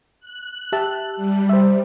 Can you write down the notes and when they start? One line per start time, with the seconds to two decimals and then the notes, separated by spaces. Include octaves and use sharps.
0.20 F#6
0.72 G4 E5 A5
1.16 G3
1.49 C5 E5